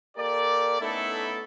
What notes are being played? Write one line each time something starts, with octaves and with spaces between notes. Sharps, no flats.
A#3 G4 A4 A#4 D5
A3 B3 C#4 D#4 E4 A4